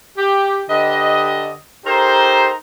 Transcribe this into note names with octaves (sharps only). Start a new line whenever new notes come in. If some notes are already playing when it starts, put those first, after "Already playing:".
G4
D3 G4 B4 D#5
D#4 G4 A4 A#4 C5